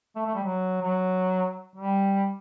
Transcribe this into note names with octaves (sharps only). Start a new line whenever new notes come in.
A3
A3
G3
F#3
F#3
G3